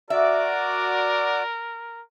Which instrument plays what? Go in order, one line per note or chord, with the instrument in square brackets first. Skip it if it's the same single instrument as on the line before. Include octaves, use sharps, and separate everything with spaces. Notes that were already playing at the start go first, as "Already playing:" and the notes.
[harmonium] F#4 D5 [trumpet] A#4 [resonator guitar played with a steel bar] E5